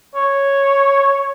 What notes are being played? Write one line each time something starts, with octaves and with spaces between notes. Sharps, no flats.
C#5